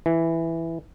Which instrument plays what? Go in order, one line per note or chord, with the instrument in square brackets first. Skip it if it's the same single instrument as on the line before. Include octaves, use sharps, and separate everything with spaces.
[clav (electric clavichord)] E3